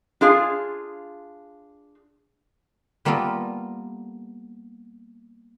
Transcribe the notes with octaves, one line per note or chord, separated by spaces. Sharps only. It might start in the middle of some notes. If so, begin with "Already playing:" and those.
D4 F4 G#4 F5
G3 A#3 B3 F4 A4 A#4